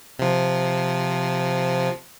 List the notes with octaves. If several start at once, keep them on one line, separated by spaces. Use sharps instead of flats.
C3 F3